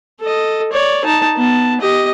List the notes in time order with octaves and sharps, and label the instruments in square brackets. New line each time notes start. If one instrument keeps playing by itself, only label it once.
[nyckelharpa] A4 D#5
C#5 D5
D#4 A5
B3 A5
G4 D#5